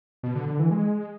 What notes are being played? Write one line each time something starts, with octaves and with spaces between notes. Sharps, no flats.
B2
D3
D3
E3
G#3